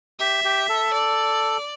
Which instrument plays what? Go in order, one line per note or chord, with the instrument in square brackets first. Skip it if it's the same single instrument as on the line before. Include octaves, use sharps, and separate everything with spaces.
[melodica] G4 [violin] E5
[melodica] G4
A4
[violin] D5